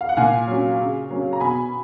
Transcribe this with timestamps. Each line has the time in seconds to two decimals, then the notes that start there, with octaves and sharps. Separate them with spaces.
0.01 F5
0.09 F#5
0.17 A#2 F5 G#5
0.48 F#3 C#4
0.80 C#3
1.10 F#3 A#3 C#4
1.33 A#5
1.40 B2 G#5 B5